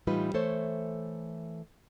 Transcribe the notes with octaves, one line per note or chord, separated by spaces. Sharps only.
A2 E3 G3 D#4 F4 B4
E3 A3 A4 C5 C#5